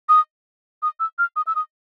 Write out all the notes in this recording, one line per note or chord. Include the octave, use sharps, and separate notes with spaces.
D#6
D#6
E6
F6
D#6
E6
D#6